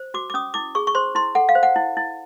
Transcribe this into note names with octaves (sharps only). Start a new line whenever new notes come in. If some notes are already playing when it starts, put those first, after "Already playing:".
Already playing: C5
F#4 D6
D6
C#4 D#6
E4 D6
G#4 C#6
C#6
C5 C6
E4 C6
A4 F#5
F5
C5
F#5
E4
E4